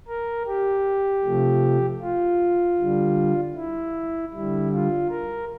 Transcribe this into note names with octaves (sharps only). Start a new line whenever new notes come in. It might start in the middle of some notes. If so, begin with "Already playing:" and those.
A#4
G4
C3 F3 A3
F4
D3 G3
E4
D3 G3 E4
F4
A#4